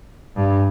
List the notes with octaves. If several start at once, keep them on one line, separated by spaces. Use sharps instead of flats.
G2